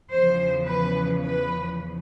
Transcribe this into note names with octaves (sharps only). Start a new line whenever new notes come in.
E2 C#3 F3 C5
B4
B4